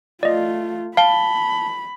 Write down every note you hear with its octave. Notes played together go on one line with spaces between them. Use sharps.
A3 F4 D5 D#5
F5 A5 B5 G7